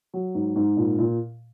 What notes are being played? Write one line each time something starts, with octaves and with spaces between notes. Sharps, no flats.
F#3
G#2
G#2
A#2
A#2